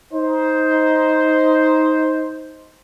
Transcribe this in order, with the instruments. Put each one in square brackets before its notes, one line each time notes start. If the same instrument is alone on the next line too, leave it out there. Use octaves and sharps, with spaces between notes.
[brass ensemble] D#4 C5